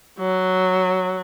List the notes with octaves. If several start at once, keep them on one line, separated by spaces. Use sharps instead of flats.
F#3